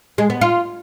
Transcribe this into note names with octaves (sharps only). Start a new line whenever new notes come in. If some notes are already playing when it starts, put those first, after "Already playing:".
G#3
B3
F4